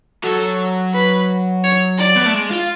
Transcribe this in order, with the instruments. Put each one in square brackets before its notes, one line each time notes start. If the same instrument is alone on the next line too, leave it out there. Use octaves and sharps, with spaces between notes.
[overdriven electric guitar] F#3 [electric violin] A4
[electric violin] B4
C#5
D5
[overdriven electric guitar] B3
A3
G#3
F4